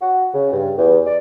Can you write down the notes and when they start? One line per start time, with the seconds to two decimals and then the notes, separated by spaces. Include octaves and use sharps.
0.01 F#4
0.33 C#3
0.52 G2
0.77 E2
1.06 D5